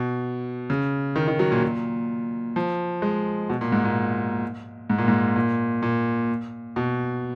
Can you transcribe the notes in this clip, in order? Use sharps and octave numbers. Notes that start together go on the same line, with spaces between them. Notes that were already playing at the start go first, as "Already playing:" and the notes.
Already playing: B2
C#3
D#3
D#3
F#3
A#2
A#2
F3
G#3
B2
A#2
G#2
A#2
G#2
A#2
G#2
A#2
A#2
B2